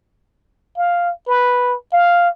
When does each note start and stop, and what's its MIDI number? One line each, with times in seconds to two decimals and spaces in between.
0.78 1.11 77
1.27 1.75 71
1.93 2.29 77